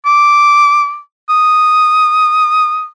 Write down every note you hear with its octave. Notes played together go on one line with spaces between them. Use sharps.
D6
D#6